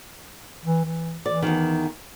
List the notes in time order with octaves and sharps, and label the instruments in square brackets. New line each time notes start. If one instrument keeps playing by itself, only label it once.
[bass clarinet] E3
E3
[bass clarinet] E3 [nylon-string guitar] D5
[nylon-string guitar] E2 D#3